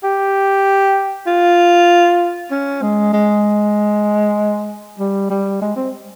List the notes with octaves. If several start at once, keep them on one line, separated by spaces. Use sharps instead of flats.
G4
F4
C#4
G#3
G#3
G3
G3
G#3
C4